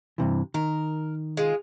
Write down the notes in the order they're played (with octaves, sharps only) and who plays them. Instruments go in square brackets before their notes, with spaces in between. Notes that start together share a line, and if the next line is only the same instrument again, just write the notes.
[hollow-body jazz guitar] G2 C3 E3
[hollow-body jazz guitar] D#3 [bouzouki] A#4
[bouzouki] G#3 F4